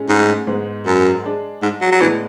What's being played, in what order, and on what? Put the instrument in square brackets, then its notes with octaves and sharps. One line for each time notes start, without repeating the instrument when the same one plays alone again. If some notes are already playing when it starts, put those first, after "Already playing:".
Already playing: [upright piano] A2 G#3 C#4 G#4
[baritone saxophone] G#2
[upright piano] G#2 G#3 B3
[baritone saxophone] F#2
[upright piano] G#3 D4 G#4
[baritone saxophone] G#2
F#3
F#3
[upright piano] A2 G#3 B3 D4 [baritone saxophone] E3